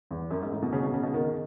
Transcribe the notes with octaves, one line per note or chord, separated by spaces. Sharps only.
E2
F#2
G#2
A2
B2
C#3
B2
C#3
B2
D#3